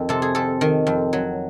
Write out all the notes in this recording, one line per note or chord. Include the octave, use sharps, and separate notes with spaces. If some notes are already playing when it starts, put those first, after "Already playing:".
Already playing: F2 D#3
C3 A4
G#4
F2 A4
D#3
F2
F#3